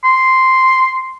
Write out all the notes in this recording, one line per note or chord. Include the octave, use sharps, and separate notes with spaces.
C6